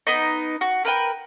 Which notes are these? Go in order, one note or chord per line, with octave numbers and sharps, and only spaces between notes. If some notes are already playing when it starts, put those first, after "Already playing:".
B3 D#4
F#4
A#4 B4 G5